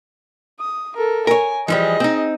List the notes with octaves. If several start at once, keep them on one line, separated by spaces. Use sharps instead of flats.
D#6
A4 A#4
A#4 C#5 G#5
E3 F3 G3 G#4 D#5
C4 D#4